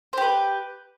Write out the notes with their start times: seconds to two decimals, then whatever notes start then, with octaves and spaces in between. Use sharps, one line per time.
0.13 C5
0.17 G4
0.22 B4